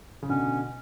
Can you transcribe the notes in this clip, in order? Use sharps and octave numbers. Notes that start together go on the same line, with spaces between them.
C#3
B2 D3 C#4